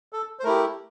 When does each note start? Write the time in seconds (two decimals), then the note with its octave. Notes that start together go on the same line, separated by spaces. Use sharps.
0.13 A4
0.39 C5
0.44 A3 E4 G4 A#4